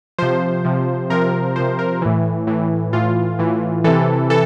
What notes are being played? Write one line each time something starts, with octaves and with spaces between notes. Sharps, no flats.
C3 F3 C5
C3 F3
C3 F3 A#4
C3 F3 C5
A#4
A2 E3
A2 E3
A2 E3 F4
A2 E3
C3 E3 A4
E3 A4